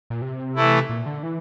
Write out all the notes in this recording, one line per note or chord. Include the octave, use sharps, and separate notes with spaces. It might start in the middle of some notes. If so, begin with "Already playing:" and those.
A#2
C3
E3 A3 E4
A#2
D3
E3